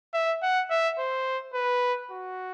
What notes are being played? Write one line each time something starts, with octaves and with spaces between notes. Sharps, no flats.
E5
F#5
E5
C5
B4
F#4